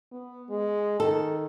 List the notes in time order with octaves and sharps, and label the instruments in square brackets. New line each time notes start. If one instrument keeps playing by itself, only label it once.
[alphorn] B3
G#3
[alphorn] D#3 [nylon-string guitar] A4